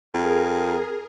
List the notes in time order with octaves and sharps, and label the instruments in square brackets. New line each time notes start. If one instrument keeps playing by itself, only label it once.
[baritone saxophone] F2 [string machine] G#4 A#4